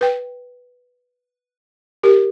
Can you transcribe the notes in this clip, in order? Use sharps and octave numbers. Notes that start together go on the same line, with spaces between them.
B4 G5
G4 A#4